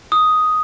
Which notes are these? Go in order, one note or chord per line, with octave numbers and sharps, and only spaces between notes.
D#6